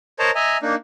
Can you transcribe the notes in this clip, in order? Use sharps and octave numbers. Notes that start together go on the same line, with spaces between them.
A#4 C5 C#5 D#5 A5 A#5
D#5 E5 G#5 A#5
A#3 D4 D#4